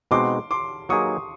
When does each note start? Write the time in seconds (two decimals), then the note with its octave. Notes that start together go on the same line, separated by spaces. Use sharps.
0.11 B2 G#3 C4 D#4 F#4 C6 D6
0.51 C6 D6
0.89 F#3 A#3 D#4 G#4 B4 C#6 D#6